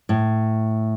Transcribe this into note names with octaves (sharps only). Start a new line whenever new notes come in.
A2